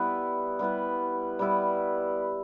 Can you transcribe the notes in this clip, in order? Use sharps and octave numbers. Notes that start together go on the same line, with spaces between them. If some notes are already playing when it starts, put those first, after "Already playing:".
Already playing: G3 B3 E4 B4
G3 B3 E4 B4
G3 B3 E4 B4